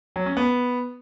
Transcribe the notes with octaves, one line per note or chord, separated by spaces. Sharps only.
F#3
C#4
B3